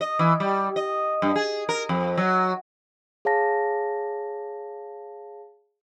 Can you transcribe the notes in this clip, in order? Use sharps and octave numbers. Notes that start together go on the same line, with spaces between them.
D#5
E3
G3
D#5
G2
G#4
A#4
F2
F#3
G#4 C#5 F5 A5 A#6